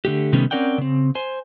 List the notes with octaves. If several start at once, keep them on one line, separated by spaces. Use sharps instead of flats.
D3 A3 G4
C3 D#3 G3 A3 B3 C#4
C4 C#4 A#4 D5 F#5 G5
C#3 C4
C5 G#5